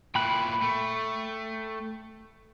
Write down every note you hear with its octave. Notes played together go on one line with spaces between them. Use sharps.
A#2 E4 G5 B5 F#6
A3